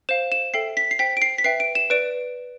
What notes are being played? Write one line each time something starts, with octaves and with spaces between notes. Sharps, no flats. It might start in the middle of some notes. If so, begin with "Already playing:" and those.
C5 F5 E7
E7
A4 E5 G5 C7
B6
C7
C5 G5 B6
D7
C7
B6
B4 E5 G5 C7
D7
E7
B4 D5 D7